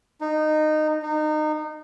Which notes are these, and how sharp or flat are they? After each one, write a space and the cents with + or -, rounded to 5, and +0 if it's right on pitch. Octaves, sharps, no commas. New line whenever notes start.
D#4 -15
D#4 -25